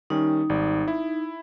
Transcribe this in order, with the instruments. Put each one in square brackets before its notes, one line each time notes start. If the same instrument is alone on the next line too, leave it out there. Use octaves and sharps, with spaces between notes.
[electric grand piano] D#3 G3 C#4 [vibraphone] D#4
[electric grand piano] G#1 G3 D5
E4